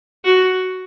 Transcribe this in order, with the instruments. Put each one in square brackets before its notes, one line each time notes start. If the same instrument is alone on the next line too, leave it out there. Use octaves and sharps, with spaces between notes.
[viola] F#4